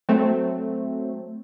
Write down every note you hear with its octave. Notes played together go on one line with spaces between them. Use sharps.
F#3 A3 C4